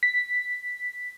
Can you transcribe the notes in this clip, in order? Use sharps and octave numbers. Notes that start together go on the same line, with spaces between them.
B6